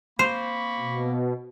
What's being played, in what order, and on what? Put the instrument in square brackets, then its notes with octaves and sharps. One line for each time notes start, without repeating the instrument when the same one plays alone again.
[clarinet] A#3 [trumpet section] C4 B5 C#6 [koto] C5
[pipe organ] B2